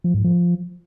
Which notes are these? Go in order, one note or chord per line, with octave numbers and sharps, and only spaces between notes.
F3
G#2
F3